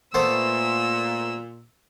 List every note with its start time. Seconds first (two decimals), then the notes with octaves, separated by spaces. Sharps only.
0.14 A#2 A3 B3 C5 E6